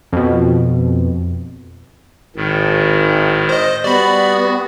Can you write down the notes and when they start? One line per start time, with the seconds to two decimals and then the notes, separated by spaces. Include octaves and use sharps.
0.13 F2 B2
2.36 G#1 A2 D#3
3.49 C5 D#5
3.84 G3 B3 F#4 D5 B5